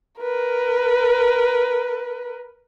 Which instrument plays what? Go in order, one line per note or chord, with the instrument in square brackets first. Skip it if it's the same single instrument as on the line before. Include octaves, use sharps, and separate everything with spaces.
[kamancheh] A#4 B4